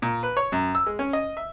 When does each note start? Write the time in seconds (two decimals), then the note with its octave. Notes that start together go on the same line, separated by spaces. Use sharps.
0.02 A#2
0.23 B4
0.37 C#5
0.52 F#2
0.75 E6
0.87 G#3
0.99 C#4
1.13 D#5
1.37 E5